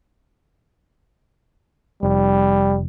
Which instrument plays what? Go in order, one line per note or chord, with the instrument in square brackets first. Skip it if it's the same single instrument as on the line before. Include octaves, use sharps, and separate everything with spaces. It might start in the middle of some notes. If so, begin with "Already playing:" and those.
[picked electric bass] F1 [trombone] G3